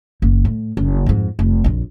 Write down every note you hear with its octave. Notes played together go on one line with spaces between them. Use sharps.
F#1 A#3
A2
F#1
F2 G#2
F1
A#1 F2